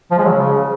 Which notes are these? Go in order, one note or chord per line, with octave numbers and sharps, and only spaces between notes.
F3
G#3
F#3
C#3